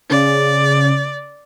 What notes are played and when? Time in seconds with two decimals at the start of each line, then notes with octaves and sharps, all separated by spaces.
0.10 C#3 D5